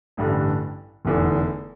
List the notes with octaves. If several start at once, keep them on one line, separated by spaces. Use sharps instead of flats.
A1 G2 D3
F1 E2 D3